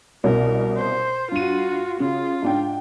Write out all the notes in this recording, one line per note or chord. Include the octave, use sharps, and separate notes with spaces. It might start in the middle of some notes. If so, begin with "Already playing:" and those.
C2 B2 C#4 A#4
C5
G2 F4 F#4 D#7
C#3 F4
G#2 D4 G5